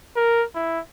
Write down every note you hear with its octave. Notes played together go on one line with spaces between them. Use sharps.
A#4
E4